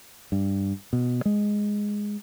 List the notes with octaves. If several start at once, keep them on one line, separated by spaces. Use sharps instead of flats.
G2
B2
G#3